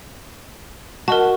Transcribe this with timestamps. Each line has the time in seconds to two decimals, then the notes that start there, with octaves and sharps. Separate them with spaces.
1.08 F#4 A#4 D#5 A5